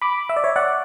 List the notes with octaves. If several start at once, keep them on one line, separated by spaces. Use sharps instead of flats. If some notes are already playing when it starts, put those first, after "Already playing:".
B5 D6
E5
D5
C#5 E5
D5 F#5